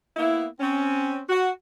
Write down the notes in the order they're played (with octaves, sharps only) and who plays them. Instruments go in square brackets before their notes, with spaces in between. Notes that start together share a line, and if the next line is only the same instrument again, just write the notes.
[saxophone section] A#3 B3 E4
C4 C#4
F#4